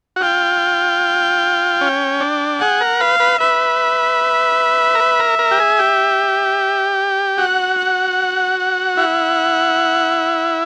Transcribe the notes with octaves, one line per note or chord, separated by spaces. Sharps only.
F#4
F4 G5
C#4
D4
G#4 F#5
A#4
B4 F5
B4
B4 E5
A#4
B4
A#4
A#4
G4
G#4
G4
F#4 F#5
F#5
E4 F#5